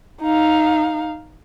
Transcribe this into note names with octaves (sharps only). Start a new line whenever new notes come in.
D#4 F5